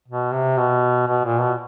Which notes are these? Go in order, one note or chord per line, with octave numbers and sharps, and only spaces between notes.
B2
C3
B2
B2
A#2
B2